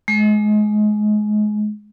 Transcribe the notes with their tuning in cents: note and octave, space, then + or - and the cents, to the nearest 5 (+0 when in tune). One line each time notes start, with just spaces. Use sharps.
G#3 +25